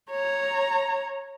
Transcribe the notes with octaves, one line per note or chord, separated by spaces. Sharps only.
C#5 A#5